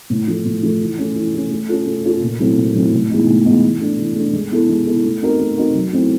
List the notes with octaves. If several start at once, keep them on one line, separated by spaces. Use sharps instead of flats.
A2
F3 A3
A2
F3 A3
E3
A3 C#4
E3
A3 C#4
A3
C#4 F4 A4
A3
C#4 F4 A4
A#2
F#3 A3 C4 E4
A#2
F#3 A3 C4 E4
A2
E3 G#3 B3 D#4
A2
E3 G#3 B3 D#4
E3
A3 D4
E3
A3 D4
G#3
B3 E4 A4
G#3
B3 E4 A4
A3
C4 D#4 F#4 A#4
A3
C4 D#4 F#4 A#4
F#3
A3 C4 E4